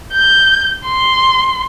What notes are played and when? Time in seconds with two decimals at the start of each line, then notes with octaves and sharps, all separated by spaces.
0.12 G6
0.85 C6